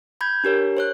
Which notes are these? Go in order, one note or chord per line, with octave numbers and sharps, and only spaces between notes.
B5 G6 G#6
D4 G4 A#4 C#5
C5 C#5 F#6